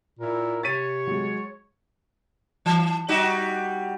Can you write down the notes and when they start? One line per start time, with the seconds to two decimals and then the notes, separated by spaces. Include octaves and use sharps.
0.19 A#2 E4 A#4
0.63 C3 C#5 A6 B6 D#7
1.07 F#3 G#3
2.66 E3
3.09 G3 D#4 F#4